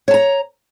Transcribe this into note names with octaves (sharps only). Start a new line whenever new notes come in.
C#5 A5 A#5